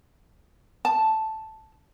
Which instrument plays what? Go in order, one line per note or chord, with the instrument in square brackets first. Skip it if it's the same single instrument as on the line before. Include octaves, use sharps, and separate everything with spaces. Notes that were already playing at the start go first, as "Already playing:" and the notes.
[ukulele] A5